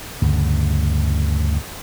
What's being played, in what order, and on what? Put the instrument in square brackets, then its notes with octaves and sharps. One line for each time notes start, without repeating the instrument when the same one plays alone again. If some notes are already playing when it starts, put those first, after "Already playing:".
[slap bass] D2 G2 C#3